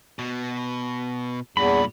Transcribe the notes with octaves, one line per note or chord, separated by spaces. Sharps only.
B2
E2 G2 A#2 B5